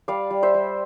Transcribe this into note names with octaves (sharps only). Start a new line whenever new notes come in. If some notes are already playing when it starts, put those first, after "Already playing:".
G3 D5 F5
G3
C5 E5
G3